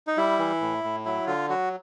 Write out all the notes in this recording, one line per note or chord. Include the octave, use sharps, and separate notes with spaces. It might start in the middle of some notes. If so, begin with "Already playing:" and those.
D#4
G3 E4
E3
A2
A2
F#3 E4
D3 F4
F#3 F#4